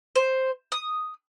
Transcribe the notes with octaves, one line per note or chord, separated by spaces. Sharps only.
C5
D#6